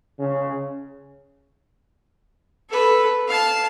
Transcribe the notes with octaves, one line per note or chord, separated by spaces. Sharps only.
C#3
A4 B4
F5 A5